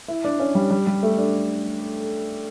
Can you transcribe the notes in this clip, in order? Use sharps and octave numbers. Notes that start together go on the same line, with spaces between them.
E4
D4
C#4
G3
G3
G3
A3
D4